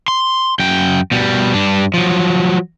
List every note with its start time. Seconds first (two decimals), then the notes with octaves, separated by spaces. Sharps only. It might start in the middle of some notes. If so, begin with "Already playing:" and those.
0.08 C6
0.59 F#2 G5
1.11 B2 G3
1.54 G2 D4
1.94 F3 F#3